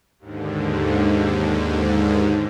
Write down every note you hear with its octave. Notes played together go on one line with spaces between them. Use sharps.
D#2 G#2 D3